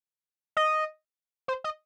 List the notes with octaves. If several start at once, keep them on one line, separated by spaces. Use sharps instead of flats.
D#5
C5
D#5